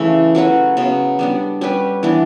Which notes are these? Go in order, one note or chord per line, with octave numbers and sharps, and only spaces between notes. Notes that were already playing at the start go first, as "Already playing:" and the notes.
Already playing: C#3 E3 A3 A4
F#3 C#4 F#4 B4
C#3 F#3 B3
G3 B3 D4
G3 C#4 G4 B4
E3 B3 D4